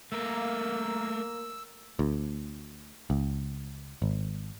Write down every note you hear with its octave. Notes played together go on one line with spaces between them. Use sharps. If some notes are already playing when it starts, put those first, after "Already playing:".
A3 A#3 A#4 E6
D2
C#2
G#1